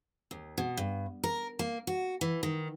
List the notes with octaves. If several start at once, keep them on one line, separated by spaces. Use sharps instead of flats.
D#2
B2
G2
A#4
A#3
F#4
E3
D#3